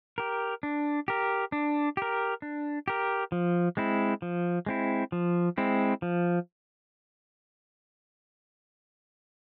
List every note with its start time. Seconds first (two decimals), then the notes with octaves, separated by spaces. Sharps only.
0.18 G4 A#4
0.63 D4
1.08 G4 A#4
1.52 D4
1.97 G4 A#4
2.42 D4
2.88 G4 A#4
3.32 F3
3.77 G#3 C4 E4
4.22 F3
4.66 G#3 C4 E4
5.12 F3
5.58 G#3 C4 E4
6.02 F3